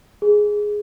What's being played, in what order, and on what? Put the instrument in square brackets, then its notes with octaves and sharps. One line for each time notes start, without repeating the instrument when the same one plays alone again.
[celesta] G#4